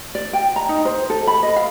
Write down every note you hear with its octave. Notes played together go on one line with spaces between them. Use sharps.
D5
G5
A#5
D#4
C5
A4
B5
D#5
F5